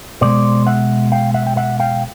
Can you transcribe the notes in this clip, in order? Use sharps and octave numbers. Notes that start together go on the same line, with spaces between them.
B2 G#3 C5 D5
E5 F#5
F5 G5
E5 F#5
G5
E5 F#5
F5 G5